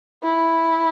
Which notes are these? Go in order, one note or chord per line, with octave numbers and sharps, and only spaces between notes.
E4